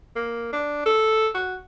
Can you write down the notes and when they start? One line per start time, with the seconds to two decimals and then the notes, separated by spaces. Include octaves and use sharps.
0.16 A#3
0.52 D4
0.85 A4
1.34 F#4